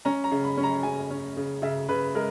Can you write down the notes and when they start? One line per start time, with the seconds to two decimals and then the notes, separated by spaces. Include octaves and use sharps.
0.05 C#4 A#5
0.24 A#5
0.31 C#3
0.44 B5
0.57 C#4
0.63 A#5
0.83 C#3 G#5
1.10 C#4
1.37 C#3
1.62 C#3 E5
1.88 C#3 B4
2.15 G#3 A#4